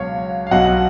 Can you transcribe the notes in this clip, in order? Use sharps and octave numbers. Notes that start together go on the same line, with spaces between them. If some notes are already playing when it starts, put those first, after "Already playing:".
Already playing: C#2 B2 F#3 C#5 F5
F5
B1 B2 F#3 D#5 F#5